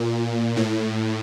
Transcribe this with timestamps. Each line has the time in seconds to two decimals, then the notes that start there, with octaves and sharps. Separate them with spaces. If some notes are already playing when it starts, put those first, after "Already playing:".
Already playing: A#2
0.57 A2